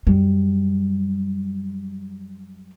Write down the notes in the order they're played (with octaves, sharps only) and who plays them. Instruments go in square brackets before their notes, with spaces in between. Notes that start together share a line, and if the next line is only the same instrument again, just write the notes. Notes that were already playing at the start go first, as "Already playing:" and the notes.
[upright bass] F#2 G3